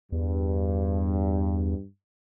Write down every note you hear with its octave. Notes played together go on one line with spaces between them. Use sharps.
E2 G2